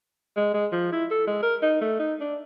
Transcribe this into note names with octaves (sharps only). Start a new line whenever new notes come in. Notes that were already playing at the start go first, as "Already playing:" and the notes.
G#3
G#3
F3
E4
A4
G#3
A#4
D#4
A3
D#4
D4